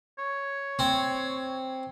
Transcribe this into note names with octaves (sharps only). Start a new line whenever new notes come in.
C#5
C4